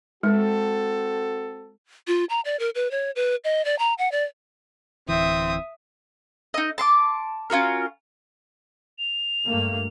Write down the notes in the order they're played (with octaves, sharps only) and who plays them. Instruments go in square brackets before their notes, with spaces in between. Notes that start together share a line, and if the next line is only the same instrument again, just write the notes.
[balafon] G#3 [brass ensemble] C4 F#4 A4
[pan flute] F4
A#5
D5
A#4
B4
C#5
B4
D#5
D5
A#5
F#5
D5
[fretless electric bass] D1 E3 [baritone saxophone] C4 [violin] E5 [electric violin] D#6
[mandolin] D#4 D#5
A5 C6 D6
C#4 F4 F#4 A#4
[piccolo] F7
[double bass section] G2 A3 A#3